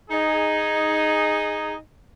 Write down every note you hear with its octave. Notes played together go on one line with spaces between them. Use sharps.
D#4 G#4